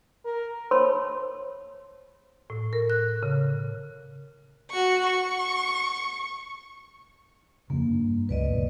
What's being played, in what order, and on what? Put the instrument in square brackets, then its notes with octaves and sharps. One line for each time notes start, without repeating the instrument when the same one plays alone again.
[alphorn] A#4
[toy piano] C5 C#5 A5 B5 C6
[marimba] A2
A#4
F#6
C#3
[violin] F#4 C#6
C#6
[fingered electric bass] F2 C#3 [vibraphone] A#3
[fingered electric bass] G2
[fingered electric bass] C#2 C3 A3 [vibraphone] B4 D5 D#5
[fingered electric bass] C#2 F#2 A#2